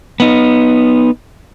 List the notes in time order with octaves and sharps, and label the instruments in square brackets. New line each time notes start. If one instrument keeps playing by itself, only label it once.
[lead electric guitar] B3 D#4